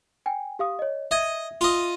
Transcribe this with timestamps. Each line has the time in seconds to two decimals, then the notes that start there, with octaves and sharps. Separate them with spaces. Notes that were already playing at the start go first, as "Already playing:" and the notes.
0.26 G5 G#5
0.59 G4 F5 D#6
0.79 C#5 D#5
1.11 D#5 E5 G#6
1.61 F4 D#5